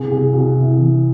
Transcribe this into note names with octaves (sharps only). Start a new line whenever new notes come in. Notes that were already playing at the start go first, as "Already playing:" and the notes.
Already playing: C2 G#4
C2 G#4
C2 F#4
C2 E4
E3